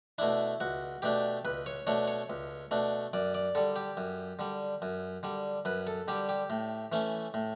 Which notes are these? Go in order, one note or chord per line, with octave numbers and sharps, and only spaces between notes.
B2 A3 D4 E4
C#2 F#4
B2 A3 D4 G4
C#2 B4
C#5
B2 A3 D4 C#5
C#5
C#2
B2 A3 D4
F#2 D5
D5
D3 G3 A4
G4
F#2
D3 G3
F#2
D3 G3
F#2 B4
A4
D3 G3 G4
G4
A2
E3 A3 C#4
A2